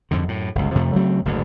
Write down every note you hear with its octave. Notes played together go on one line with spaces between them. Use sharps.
F2 G#2 D3
F#2 A2
G1 C#2
F2 C3 F3 A3
C#3 F#3 A3 C4
F#1 D2 G#2